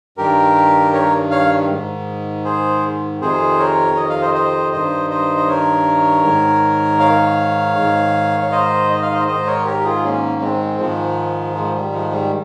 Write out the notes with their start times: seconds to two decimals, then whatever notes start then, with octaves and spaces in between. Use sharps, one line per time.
0.17 G2 D#3 G4 A#4
0.94 A#4 C#5
1.31 C#5 F5
1.69 G#2 D#3
2.44 G#4 C5
3.20 F2 C3 D#3 G#4 C5
3.58 A#4 C#5
3.97 D#5
4.10 F5
4.21 C5 D#5
4.35 C5 D#5
4.72 G2 D#3 C5 D#5
5.10 C5 D#5
5.37 D#5
5.48 A#4 C#5
6.24 G#2 D#3
7.00 C#5 F5
7.76 G#2 D#3
8.42 C#5
8.52 C5 D#5
8.91 D#5
9.02 F5
9.14 C5 D#5
9.28 G#2 D#3 C5 D#5
9.46 A#4 C#5
9.65 G4 A#4
9.80 G4
9.84 F4 G#4
10.04 A#3 C#4
10.41 G#3 C4
10.79 G#2 D#3 F3 G#3
11.55 F3
11.75 G3
11.93 F3 G#3
12.12 G3